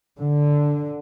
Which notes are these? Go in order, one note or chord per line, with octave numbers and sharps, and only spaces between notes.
D3